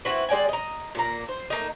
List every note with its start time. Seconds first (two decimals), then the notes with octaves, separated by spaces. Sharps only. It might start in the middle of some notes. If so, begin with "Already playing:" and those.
0.05 C4 E4 F#4 B4
0.28 G#3 D5 G5 G#5
0.49 D#5 A#5
0.95 A#2 A#3 A#5
1.29 C5
1.50 A3 A#3 D#4